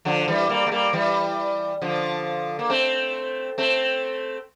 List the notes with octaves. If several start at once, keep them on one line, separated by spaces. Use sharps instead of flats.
D3 F3
E3 G3
G3 A#3
A3
G3 A#3
E3 G3
D3 F3
A#3
A3 C4
A3 C4